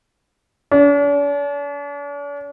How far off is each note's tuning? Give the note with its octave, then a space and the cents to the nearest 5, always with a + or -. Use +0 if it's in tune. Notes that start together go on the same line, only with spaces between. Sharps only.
D4 -45